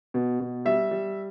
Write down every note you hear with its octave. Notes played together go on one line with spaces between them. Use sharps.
B2
B2
G3 E5
G3